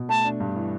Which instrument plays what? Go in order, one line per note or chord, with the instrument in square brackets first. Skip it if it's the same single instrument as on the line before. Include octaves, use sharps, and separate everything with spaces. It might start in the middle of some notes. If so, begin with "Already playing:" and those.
Already playing: [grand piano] B2
[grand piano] A3 [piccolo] A5
[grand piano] D4
G2
E3